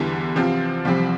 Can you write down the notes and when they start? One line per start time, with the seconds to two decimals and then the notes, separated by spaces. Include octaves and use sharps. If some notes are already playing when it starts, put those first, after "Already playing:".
Already playing: E2 D3 E3 G3
0.36 C3 F3 C4 F4
0.85 C2 C3 F3 G3 C4